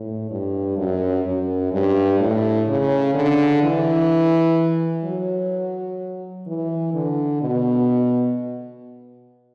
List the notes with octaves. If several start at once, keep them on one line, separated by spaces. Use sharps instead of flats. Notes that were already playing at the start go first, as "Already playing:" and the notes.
Already playing: A2
G2
F#2
F#2
G2
A2
C#3
D3
E3
F#3
E3
D3
B2